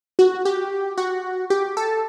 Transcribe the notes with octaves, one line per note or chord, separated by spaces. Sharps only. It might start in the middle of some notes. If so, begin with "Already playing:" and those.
F#4
G4
F#4
G4
A4